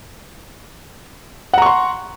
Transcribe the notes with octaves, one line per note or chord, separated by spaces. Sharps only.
F#5 A#5 C6 C#6